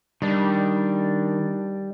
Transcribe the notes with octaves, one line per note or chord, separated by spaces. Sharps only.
D#3 G3 D4